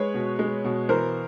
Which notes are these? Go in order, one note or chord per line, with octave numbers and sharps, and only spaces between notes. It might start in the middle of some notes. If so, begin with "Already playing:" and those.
Already playing: G#3 B4 C#5
B2
G#3
B2
E3 A#4 C5